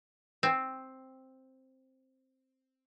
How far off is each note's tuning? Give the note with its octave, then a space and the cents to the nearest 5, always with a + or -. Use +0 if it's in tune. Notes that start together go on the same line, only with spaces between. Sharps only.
C4 +5